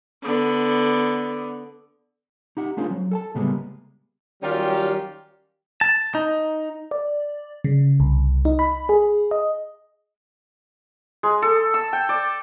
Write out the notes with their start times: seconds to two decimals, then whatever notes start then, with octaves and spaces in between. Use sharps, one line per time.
0.22 D3 B3
2.57 D#4 G4 F#5
2.77 A3 C#4 D4 F4 G#4 C5
2.91 F#3
3.11 A4 G#5 A5
3.35 A2 C#3 G3 G#3 A#3 B3
4.43 D#3 F#3 G3 C#4 F4 G4
5.81 A5
6.15 D#4
6.91 D5
7.64 C#3
8.00 C2
8.45 D#4
8.59 B5
8.89 G#4
9.31 D#5
11.23 G#3
11.42 A4
11.74 E6
11.93 G5
12.09 D5